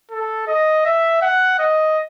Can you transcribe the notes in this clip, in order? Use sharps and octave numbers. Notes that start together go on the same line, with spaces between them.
A4
D#5
E5
F#5
D#5